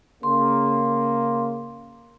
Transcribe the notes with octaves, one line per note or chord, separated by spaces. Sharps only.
C#3 A#3 C6